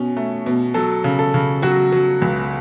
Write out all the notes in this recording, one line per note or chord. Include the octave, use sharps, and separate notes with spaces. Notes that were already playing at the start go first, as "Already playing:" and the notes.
Already playing: B2 C#4
A3
B2
F#3 A4
C#3
A4
C#3
F#3 F#4
F#3
C#2